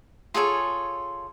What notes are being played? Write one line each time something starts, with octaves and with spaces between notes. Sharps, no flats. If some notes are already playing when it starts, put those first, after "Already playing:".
F4 G#4 A4 C#5